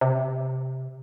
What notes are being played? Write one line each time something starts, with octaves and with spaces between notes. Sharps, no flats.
C3